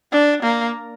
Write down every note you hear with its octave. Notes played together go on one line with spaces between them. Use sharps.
D4
A#3